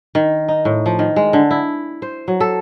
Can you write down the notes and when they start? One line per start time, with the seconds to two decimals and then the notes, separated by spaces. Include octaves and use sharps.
0.15 D#3
0.48 D#4
0.65 A2
0.86 F3
0.99 D#3
1.16 G#3
1.33 D3
1.51 E4
2.02 C5
2.28 F#3
2.40 A4